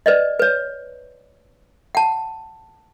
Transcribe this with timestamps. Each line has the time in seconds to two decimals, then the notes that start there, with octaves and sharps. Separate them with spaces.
0.06 B4 D5 D#5
0.39 B4 C#5
1.95 F#5 A5